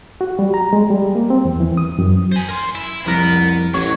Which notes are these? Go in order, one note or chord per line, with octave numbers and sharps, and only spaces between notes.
F#4
G3
A#5
G#3
G3
A#3
C4
E2
E3
D#6
F#2
C5 G#5
A#4 C6
E4
C2 F2 B3 A#4
A1 F#3 F#4 C#5